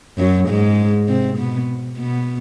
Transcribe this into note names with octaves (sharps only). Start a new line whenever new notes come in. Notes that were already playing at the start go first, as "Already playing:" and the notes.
F#2 F#3
G#2 G#3
C3 C4
B2 B3
B2 B3